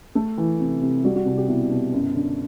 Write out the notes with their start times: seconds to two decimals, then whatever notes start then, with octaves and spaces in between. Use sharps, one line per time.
0.15 A3 A4
0.38 E3
0.60 C3
0.82 C3
1.03 G3 F#4
1.16 F#4
1.26 C2
1.37 G4
1.48 B2 E4
1.70 B2
1.93 F#2
2.15 D3